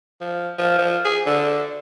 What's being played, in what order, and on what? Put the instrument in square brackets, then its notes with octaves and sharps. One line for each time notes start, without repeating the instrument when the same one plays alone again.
[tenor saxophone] F3
F3
F3
G#4
D3